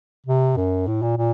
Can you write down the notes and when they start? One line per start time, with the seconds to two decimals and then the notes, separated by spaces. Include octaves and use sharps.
0.26 C3
0.57 F#2
0.87 A2
1.02 A#2
1.18 A#2